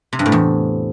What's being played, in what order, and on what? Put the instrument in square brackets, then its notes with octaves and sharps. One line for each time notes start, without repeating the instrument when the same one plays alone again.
[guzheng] C3
G2
A2
E2